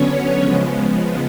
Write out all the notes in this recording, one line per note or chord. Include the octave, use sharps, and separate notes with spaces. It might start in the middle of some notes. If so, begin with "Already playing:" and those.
Already playing: D3 F#3 B3 C#4 C#5
C#3 F3 G#3 B3